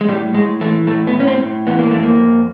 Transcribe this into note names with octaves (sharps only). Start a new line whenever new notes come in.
G#3
A2 G3
A2 G#3
E3 A3
A2 A3
B3
A2
C#4
C4
A2
E3 B3
A#3
F2 A3
A#3
F2